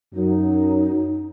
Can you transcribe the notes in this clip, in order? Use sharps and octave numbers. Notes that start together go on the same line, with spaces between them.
F#2 F#3 D#4